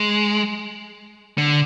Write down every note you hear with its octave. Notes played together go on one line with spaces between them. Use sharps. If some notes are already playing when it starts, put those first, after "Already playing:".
Already playing: G#3
D3